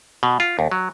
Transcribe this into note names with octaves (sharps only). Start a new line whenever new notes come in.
B2
F4
D#2
F#3